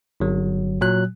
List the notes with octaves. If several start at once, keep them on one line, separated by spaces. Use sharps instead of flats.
G1 F#3
A#2 F#3 F#6